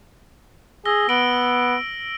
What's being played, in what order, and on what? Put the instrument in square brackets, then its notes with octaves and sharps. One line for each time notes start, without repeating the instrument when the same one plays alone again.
[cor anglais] G#4 [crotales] E6 A#6 G7
[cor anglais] B3 [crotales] D7 F#7 G7